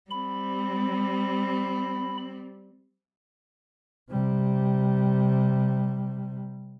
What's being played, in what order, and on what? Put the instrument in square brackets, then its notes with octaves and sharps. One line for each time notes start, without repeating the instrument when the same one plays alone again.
[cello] G3 C4 [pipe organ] B5
[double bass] C3 G3